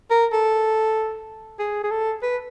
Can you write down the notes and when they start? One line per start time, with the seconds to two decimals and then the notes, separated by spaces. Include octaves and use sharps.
0.11 A#4
0.32 A4
1.59 G#4
1.84 G#4
1.90 A4
2.22 B4